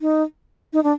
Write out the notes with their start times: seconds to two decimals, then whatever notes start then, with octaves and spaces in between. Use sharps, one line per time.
0.01 D#4
0.73 D#4
0.83 D4